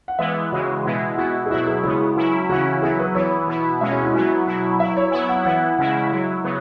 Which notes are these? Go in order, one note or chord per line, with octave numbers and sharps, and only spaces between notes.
F#5
E3 G#3 B3 E4 E5
C#3 E3 G#3 F#4
B2 G#3 B3 E4
B2 B3 E4 F#4
G#4
B2 F#3 E4 F#4
G#4
C#3 G#3 B3 E4
F#3 C#4 E4
C#3 E3 C#4 E4 F#4
F#3 B3 E4 G#4
B4
E3 B3 E4 C#5
B2 B3 E4
B2 G#3 C#4 E4 E5
F#4
E4
F#3 B3 E4 F#4
B2 F#3 B3 E4
F#3 E4 E5
C#5
F#3 B3 E4 G#5
F#5
E3 B3 E4 F#5
C#3 G#3 C#4 E4 F#5
F#3 E4
C#3 F#3 B3